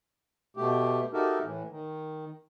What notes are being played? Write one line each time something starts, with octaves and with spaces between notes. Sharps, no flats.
B2 A3 G4
D#4 F#4 G4 A4 A#4 E5
A2 E3
D#3